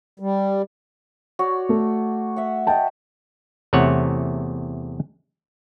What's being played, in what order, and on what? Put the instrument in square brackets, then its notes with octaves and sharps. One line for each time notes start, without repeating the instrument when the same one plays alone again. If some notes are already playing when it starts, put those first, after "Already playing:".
[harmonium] G3
[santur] F#4 C#5 D5
[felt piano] A3
[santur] E5 F#5
[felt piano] D#5 G5 A5
[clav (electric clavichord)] E2 C3 A3 C#5 F#5